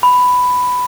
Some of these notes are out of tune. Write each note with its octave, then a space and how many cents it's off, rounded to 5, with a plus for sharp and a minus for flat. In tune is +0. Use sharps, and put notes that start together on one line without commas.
B5 +10